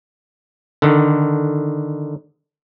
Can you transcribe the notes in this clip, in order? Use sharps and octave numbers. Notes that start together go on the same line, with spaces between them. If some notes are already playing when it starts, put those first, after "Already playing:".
D3 D#3